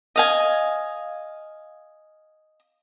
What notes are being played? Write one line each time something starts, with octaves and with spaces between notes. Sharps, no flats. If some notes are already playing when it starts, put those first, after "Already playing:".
D#5 F5 G#5